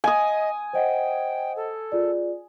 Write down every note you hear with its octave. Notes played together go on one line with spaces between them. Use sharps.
D#5 G#5 D#6
C5 D#5 F#5 G5
A4
F4 G#4 D5